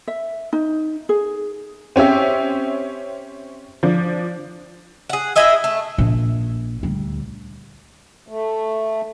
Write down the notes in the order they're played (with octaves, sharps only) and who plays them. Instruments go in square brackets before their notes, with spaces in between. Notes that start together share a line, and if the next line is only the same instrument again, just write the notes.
[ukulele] E5
D#4
G#4
[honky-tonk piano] C4 C#4 G4 E5
F3 D4
[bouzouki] G#4 F#5
E4 G#4 D#5 E5
A3
[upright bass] A#1
D2 G3
[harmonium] A3